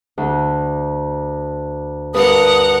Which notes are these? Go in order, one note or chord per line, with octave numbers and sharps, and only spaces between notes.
D2
G2 A#4 B4 F#5 D#6